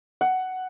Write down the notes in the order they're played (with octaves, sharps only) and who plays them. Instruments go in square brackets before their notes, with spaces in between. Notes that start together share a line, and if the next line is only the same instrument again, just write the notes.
[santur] F#5